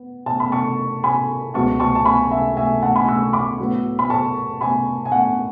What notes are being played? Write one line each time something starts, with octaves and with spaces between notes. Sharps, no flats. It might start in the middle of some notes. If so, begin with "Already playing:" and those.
Already playing: B3
A5
B5
A5 C#6
G#5 B5
C#2 B2 F#3 B3 A5 C#6
A5 C#6
A5
G#5 B5
E5 G#5
E5 G#5
F#5 A5
G#5 B5
C#6 E6
B5 D6
A2 F#3 B3
B5
A5 C#6
G#5 B5
G#5
F#5